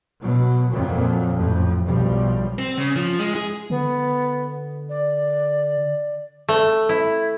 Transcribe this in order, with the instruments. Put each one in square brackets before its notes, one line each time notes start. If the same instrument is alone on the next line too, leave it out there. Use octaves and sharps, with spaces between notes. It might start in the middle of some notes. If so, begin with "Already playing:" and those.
[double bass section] B2 F#3
F2 A#2 F#3
A1 F2
B1 F3 G3
[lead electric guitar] C4
C#3
F3
G#3
G#4
[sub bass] D3 [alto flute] B3
[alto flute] D5
[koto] A3
E4